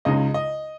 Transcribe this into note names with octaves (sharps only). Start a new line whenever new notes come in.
C#2 C#3 G#3 D#4 D#5
D#5